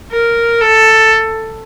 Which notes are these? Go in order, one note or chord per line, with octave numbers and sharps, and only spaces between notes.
A#4
A4